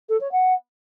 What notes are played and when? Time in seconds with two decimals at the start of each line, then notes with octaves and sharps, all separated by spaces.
0.09 A4
0.20 C#5
0.32 F#5